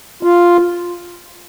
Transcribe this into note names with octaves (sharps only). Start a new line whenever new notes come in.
F4